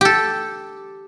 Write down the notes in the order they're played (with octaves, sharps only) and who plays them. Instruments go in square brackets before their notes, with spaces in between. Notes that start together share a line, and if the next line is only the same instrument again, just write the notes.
[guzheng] G4 A4